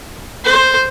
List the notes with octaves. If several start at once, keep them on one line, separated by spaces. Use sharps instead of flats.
C5